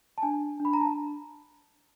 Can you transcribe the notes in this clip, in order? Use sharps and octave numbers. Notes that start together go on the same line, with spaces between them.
A5
D4 G#5
D4
B5
A#5
A5